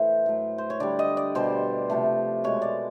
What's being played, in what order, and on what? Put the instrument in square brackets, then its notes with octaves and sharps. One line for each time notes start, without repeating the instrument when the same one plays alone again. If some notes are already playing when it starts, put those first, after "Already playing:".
Already playing: [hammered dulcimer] A2 E3 A3 C5
A2 F#3 A3
C5
C#5
D3 G3 D5
D#5
D5
B2 G3 C5
C3 F3 A3
B2 G#3 C#5
D5